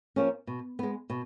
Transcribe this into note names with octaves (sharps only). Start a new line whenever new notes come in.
F3 A#3 C#4
B2
G#3 B3
B2